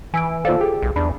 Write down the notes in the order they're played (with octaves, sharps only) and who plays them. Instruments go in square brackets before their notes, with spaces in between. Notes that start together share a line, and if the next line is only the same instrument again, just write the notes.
[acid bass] E3 [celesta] G#5 E6 D7
[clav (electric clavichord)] D#2 D5 [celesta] F4 C5 F5 [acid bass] A4
[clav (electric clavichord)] G4 [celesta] G#4
[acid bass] B1
[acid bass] E2 [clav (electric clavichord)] D4 [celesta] B5